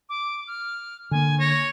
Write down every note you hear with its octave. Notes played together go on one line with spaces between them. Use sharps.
D6
F6
D3 A#3 G#5
C#5 A#6